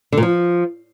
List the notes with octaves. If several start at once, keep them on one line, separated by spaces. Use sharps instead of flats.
D3
A#2
F3